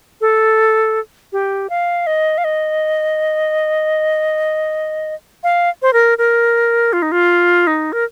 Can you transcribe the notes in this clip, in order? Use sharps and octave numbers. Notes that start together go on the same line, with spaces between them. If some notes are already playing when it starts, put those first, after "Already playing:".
A4
G4
F5
D#5
F5
D#5
F5
C5
A#4
A#4
F4
D#4
F4
D#4
A#4